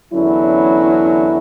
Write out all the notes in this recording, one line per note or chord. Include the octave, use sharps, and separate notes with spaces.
E2 D3 F#3 C#4 E4